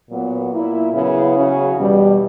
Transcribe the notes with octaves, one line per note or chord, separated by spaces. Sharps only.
A#2 F#3 B3
A#2 A#3 E4
C#3 F#3 B3 E4
C#3 F#3 C#4
E2 B2 G3